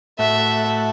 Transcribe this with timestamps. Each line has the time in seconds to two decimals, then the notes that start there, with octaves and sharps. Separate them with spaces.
0.19 A2 A3 F#4 E5